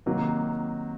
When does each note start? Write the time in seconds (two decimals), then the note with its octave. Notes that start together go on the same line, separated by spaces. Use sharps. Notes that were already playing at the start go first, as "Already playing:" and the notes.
0.06 C3 D#3 F#3 A#3